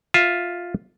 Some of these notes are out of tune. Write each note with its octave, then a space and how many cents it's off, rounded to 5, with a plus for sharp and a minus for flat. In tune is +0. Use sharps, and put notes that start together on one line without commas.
F4 +5 E5 +0